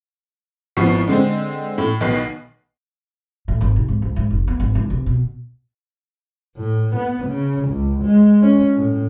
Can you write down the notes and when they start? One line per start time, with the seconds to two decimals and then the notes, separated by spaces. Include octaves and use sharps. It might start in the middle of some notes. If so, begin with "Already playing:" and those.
0.77 G#1 F3 B3 E4 C#6 C7
1.08 D3 G#3 C4
1.78 A2
2.00 B1 B2 D#3 B4 C7
3.48 A2
3.61 G#1
3.76 C3
3.88 G#2
4.02 C#2
4.16 G#2
4.31 F1
4.48 B3
4.60 G#1
4.75 C#2
4.90 C3
5.06 B2
6.57 A2
6.96 B3
7.26 C#3
7.69 C#2
8.04 G#3
8.42 C#4
8.76 A2